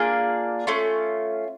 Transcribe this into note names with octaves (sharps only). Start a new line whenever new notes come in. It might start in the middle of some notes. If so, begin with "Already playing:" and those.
Already playing: A#3 D4 F4 G#4
A3 C#4 F4